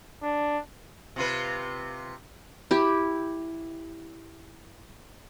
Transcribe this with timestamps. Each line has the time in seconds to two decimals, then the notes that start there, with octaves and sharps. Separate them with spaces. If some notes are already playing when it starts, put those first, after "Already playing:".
0.23 D4
1.16 C3 F4 B4
2.71 E4 G4